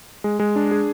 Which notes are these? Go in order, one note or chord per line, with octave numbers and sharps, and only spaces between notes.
G#3
G#3
D4
G#4